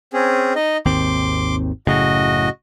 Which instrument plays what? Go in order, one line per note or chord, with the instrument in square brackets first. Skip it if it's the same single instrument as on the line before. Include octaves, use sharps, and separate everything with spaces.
[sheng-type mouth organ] C4 C#4 G#4
D#4 D#5
[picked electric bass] G#1 D#2 C4 [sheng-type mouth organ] C6 D6
[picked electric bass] F#1 A2 C#3 [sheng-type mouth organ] F#4 D#5